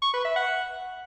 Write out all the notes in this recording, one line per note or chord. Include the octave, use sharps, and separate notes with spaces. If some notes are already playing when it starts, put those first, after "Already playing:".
C#6
B4
E5
F#5